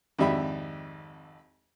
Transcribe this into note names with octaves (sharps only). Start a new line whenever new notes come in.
G#1 F2 D4 G4 E5 B5